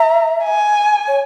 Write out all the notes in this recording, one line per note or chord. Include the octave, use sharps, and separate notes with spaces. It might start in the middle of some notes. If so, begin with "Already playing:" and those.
Already playing: E5 A#5
G#5
C#5